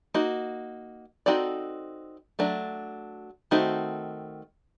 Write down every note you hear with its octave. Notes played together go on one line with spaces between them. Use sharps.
A#3 D#4 F#4
C4 D#4 F#4 A4 D5
F#3 A3 D4
D#3 A3 C4 D#4 F#4